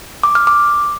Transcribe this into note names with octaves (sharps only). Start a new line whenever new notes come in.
D6
F6
D6